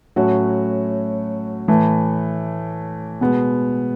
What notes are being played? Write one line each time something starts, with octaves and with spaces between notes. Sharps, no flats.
A2 F#3 A3 C#4 F#4
A2 E3 A3
B2 G#3 B3